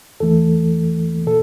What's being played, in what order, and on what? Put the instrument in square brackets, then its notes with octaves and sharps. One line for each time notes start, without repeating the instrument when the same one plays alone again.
[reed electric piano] E2 E3 A3 A4
A#2 A4